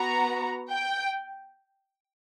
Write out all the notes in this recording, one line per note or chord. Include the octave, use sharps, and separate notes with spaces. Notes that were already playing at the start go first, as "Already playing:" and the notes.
Already playing: B3 F#4 A#5
G5